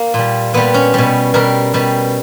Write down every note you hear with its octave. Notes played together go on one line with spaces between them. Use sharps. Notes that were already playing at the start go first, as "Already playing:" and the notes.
Already playing: A#3
A#2 G3
A#2 G3 B3
C#4
B2 G3
B2 G3 A#4
B2 G3